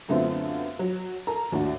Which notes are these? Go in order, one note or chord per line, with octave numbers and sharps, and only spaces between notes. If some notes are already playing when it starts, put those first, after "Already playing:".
F#2 D3 A3 B3 C4 F4
F#3
A4 A#4 A#5
D#2 A2 D4 F#4